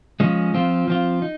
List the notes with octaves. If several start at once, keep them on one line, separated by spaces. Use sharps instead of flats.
F3 G#3 C#4
F3 C4 F4
F3 C4 F4
D#4